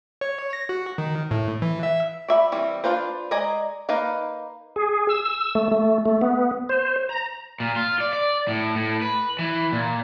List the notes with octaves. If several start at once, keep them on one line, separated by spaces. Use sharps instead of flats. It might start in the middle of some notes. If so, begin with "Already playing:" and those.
C#5
A#6
F#4
D#3
A2
E3
E5
D5 E5 B5
E3 G3 C4
D4 F4 B4 C5
G#3 D5 D#5 G#5 A#5
A#3 D#4 B4 F5
G#4
E6
A3
A3
A3
B3
C5
A#5
A#2
F4
D5
D5
A2
A2
B4
E3
A#2